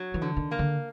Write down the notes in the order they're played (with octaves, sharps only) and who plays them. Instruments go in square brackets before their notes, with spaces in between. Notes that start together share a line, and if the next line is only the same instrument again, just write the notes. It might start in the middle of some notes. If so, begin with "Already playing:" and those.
Already playing: [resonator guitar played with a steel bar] F#3
[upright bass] E3
[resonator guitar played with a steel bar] D3
[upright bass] D#3
[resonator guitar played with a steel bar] A#3
[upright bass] D3